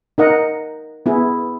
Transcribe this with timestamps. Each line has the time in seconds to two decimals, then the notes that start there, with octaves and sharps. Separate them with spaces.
0.18 D#4 A#4 D#5 F#5
1.06 B3 E4 G#4